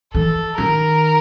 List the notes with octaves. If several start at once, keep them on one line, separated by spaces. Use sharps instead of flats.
E3 A4
D#3 A#4